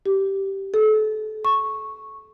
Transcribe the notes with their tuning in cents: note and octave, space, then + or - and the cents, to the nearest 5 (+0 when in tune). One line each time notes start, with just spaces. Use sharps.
G4 -10
A4 -35
C#6 -10